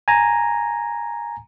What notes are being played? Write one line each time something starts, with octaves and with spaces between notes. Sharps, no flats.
G#5 A#5